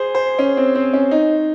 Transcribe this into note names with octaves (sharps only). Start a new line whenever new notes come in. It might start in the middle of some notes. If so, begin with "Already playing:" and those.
Already playing: G#4 C5
C5
C#4
C4
C4
C#4
D#4